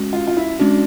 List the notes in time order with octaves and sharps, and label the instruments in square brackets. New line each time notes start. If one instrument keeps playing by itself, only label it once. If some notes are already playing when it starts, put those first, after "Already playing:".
Already playing: [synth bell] G#3 C#4 F#4
[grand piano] F4
F4
E4
[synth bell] G#3 C#4 F#4 [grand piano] D4